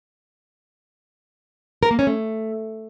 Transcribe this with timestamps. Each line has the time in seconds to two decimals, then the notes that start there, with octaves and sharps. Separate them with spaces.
1.83 A#4
1.91 A#3
1.99 C#4
2.07 A3